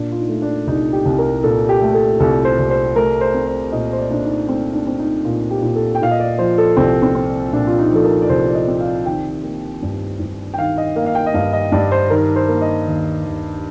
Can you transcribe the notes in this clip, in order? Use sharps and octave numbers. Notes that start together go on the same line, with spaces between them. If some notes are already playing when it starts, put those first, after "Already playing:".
Already playing: A#2 D4
F4
D#4
A3
D4
C2 D#4
G4
C2
A#4
A#2 A4
G4
A3
A4
C2 A4
C5
C2
C5
A3 A#4
C5
C4
C5
A#2 D#5
C5
D5
A#2 D4
D#4
A3 C4
D4
C4
D#4
A#2 F4
G4
A#2
A4
G5
A#2 F5
D#5
D5
F3 C5
A4
C2 C4
C4
C4
A#2 D4
F4
D#4
F3 A4
A#4
D5
C2 C5
D5
D#5
C4
F5
D#3 G5
A#3
G2
G2
G5
D#3 F5
D#5
A#3 F5
F5
G5
D#5
G2 F5
D#5
G2 D5
C5
D#3 A#4
C5
A#3
D#5
D#2
D#2